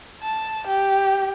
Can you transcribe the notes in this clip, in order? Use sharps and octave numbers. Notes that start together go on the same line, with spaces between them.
A5
G4